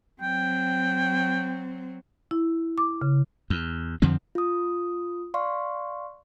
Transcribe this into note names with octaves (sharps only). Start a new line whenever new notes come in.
F#3 C4 G5
E4
D6
C#3
E2
F2 D3 F3 C4
F4 D#6
D5 F5 C6 C#6